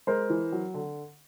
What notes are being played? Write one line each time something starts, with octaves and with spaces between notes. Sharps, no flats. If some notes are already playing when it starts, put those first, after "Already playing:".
G#3 A#4 C5
E3
F#3
D3